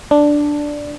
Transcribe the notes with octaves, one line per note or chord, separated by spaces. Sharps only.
D4